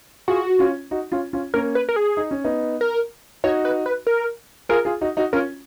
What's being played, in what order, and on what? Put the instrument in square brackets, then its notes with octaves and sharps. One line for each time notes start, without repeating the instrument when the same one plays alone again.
[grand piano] F4 G#4 [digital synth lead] F#4
[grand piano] C#4 F4
D#4 F#4
C#4 F4
C#4 F4
[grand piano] A#3 C#4 [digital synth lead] A#4
[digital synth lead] B4
A#4
G#4
[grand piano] D#4
C#4
B3 D#4
[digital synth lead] A#4
[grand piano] D#4 F#4 [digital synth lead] C#5
[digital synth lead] B4
B4
A#4
[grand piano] F4 G#4 [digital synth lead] A#4
[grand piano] F4 G#4
D#4 F#4
D#4 F#4
[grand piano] C#4 F4 [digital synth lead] A#4